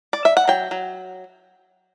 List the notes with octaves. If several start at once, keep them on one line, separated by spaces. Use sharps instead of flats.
D5
E5
F#5
F#3 G5
F#3